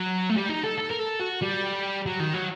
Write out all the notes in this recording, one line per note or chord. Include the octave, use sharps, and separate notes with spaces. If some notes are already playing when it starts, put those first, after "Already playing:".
Already playing: F#3
A3
G3
D#4
A4
A4
A#4
A4
F#4
G3
F#3
D#3
F#3